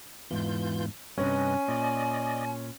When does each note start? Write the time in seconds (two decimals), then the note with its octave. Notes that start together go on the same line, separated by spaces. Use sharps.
0.31 E2 G#2 E3 F4 G6
1.18 G2 C3 C#4 B4 D#5 G#5
1.68 A#2 D5 D#5